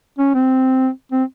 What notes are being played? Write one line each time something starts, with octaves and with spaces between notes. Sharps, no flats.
C#4
C4
C4